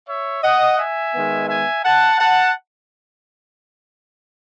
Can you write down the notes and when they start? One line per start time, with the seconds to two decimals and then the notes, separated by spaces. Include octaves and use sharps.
0.09 C#5 E5
0.43 D#5 F#5
0.79 E5 G#5
1.14 D#3 G#3 B3
1.49 E5 G#5
1.85 F#5 A5
2.20 F#5 A5